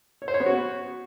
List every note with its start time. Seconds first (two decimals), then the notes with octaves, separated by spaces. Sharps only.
0.22 C#5
0.28 C5
0.34 C#5
0.40 B3
0.46 F#4